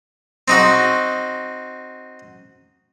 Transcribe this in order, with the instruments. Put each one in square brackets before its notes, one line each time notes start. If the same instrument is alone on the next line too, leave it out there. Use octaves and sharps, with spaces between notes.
[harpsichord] C4 D#4 F#4